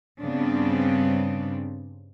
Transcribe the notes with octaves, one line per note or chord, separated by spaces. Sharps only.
G2 C#3 G3 B3 C4 D4